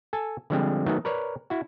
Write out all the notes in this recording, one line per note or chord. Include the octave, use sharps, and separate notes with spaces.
A4 G#5 A5
D3 F3 G3 G#3 C4
D#3 F#3 A3 B3 D#4
A#4 B4 C#5 D5
E4 F#4